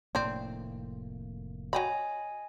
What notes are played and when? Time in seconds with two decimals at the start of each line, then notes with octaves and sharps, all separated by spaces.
0.15 F1 A2 A#3 C4 D4
1.73 F#3 D#5 G5 G#5 B5